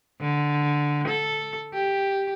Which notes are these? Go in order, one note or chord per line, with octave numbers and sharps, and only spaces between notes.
D3
A4
G4